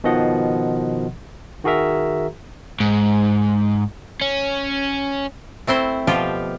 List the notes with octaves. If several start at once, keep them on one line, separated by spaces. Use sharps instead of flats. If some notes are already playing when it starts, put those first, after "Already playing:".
B2 D#3 F3 D#5 F#5
D#3 F#4 G#4 A#4 E5 A#5
G#2
C#4
A3 C4 E4 C5
B2 F3 F4 G4